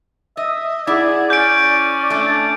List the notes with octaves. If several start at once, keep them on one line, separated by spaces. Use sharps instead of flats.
D#5 E5
E4 G#4 D5 F#5 G#6
C#4 D5 D6 G6 D7
A3 D4